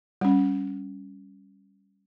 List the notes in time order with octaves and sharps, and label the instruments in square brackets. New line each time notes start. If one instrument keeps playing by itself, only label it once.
[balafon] G3 C#4